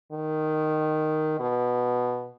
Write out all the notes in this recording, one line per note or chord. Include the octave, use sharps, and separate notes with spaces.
D#3
B2